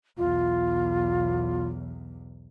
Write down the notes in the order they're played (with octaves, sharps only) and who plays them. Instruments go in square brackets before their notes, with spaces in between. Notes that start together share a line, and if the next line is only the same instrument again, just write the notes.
[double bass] B1 E2 [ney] F4